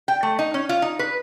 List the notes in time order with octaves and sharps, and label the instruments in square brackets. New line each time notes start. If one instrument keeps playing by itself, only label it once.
[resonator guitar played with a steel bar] G5
A3
D#4
C#4
F4
D#4
B4